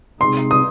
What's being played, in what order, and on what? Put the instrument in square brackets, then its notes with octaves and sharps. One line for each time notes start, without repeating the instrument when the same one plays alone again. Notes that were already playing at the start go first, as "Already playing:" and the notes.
[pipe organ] C3 G#3 C4 D#4 G#4 [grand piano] C6
[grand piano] D#6